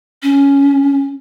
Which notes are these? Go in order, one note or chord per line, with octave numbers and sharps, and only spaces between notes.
C#4